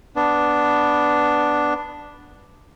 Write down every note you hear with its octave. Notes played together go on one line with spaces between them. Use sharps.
B3 D4